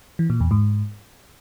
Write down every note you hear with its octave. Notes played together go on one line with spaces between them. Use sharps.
E3
A#2
E2
G#2